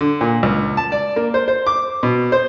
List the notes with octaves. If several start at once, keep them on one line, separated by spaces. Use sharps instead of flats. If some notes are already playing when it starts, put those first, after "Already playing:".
D3
A#2
C#2
A5
D5
A#3
C5
C5
D6
B2
C5